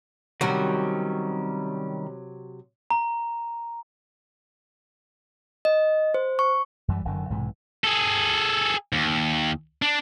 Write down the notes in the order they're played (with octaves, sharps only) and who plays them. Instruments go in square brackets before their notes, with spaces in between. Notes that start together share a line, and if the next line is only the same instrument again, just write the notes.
[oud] C3 F#3 F#4 [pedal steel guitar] D#3 G3 C#4
[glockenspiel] A#5
[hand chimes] D#5
C5
C#6
[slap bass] F#2 E3 G3
F#1 F#2 D3 D#3
B1 G#2 C3 E3
[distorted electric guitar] G#4 A4
D#2
D4